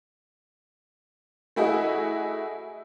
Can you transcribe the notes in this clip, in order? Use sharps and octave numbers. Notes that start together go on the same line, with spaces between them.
A3 E4 F#4 G#4 D#5